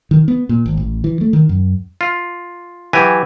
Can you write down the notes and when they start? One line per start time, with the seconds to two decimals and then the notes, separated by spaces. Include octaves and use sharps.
0.11 D#3
0.28 B3
0.49 A#2
0.66 G#1
0.77 A1
1.04 E3
1.21 A3
1.33 D#3
1.49 F#2
2.01 F4
2.93 E3 F#3 G4 G#5